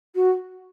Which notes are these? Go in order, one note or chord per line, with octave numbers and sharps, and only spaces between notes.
F#4